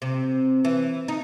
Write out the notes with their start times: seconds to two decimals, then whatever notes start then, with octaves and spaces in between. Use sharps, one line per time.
0.02 C3
0.65 E3
1.08 D#4